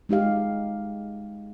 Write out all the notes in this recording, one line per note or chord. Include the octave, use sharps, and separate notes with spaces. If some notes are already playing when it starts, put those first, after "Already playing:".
G#3 D#4 G4 F5